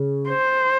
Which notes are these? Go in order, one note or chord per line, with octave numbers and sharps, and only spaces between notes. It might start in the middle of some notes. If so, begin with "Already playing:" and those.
Already playing: C#3
C5